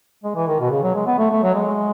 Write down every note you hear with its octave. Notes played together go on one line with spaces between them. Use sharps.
G#3
E3
D#3
B2
C#3
F#3
G#3
B3
A3
A3
F#3
G#3